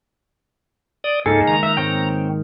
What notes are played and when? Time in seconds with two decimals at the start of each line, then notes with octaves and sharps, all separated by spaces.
1.04 D5 D#6
1.26 C#2 G#2 A#3 D#4 G#4 A4 D6
1.47 D#3 A#5 C#6
1.63 D#4 A#4 E5
1.77 G#2 C4 C#5 G5